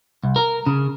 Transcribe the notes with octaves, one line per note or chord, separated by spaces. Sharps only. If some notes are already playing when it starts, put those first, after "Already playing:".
C2
A#4
C#3